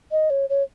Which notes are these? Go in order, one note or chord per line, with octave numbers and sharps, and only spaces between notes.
D#5
C#5
C#5